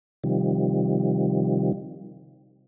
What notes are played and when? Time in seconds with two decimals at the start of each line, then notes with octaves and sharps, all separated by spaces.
0.24 C3 D#3 F3 G3